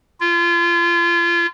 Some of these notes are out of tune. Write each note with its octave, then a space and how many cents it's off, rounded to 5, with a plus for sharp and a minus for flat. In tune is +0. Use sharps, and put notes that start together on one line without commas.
F4 -30